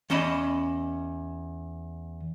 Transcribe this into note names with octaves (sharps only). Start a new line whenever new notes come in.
E2 C#4 D#5 A5 B5